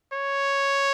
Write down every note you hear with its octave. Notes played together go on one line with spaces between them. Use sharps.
C#5